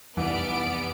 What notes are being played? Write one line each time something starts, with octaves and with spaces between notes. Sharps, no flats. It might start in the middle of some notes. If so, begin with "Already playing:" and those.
F1 C2 F2 E3 B3 D5 D7